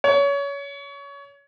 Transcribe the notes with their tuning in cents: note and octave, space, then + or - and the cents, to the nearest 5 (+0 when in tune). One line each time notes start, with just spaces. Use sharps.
C#5 +25